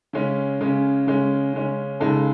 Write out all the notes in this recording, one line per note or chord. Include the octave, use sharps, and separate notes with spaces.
C#3 G#3 C#4
C#3 G#3 C#4
C#3 G#3 C#4
C#3 G#3 C#4
C#2 C#3 G#3 D#4 A4